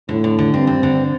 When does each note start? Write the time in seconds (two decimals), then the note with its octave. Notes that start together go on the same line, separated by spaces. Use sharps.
0.09 A2 D3
0.24 D3
0.39 D3
0.54 G2 C4
0.67 C4
0.83 D3